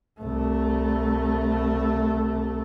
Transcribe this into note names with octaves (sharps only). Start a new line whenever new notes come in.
C2 A3